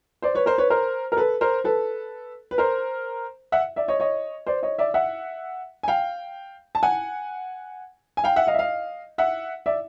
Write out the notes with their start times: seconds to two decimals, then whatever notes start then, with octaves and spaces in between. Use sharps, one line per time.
0.22 C5 D5
0.35 B4 C#5
0.46 A#4 C5
0.58 B4 C#5
0.70 A#4 C5
1.12 A#4
1.17 A4 B4
1.41 A#4 C5
1.64 A4 B4
2.51 B4
2.58 A#4 C5
3.52 E5 F#5
3.76 D5 E5
3.88 C#5 D#5
4.00 C#5 D#5
4.47 C5 D5
4.63 C#5 D#5
4.78 D5 E5
4.94 E5 F#5
5.83 G#5
5.88 F5 G5
6.75 A5
6.83 F#5 G#5
8.17 G#5
8.24 F5 G5
8.36 E5 F#5
8.47 D#5 F5
8.54 E5
8.59 D#5 F5
9.18 E5 F#5
9.66 D5 E5